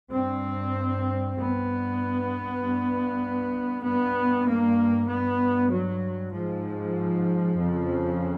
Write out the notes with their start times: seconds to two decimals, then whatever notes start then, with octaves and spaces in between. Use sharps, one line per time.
0.13 G2 C4
1.37 G2 B3
2.60 G2
3.85 G2 B3
4.47 A#3
5.08 G2 B3
5.70 F#3
6.32 G#2 F3
7.56 F2 C#3